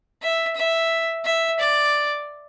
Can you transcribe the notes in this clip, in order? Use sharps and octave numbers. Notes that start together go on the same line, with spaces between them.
E5
E5
E5
D5